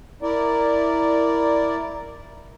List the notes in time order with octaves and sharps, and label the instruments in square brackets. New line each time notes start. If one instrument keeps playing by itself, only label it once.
[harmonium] E4 A#4 D5